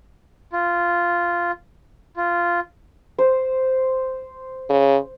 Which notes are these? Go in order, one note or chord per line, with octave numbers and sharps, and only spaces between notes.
F4
F4
C5
C#3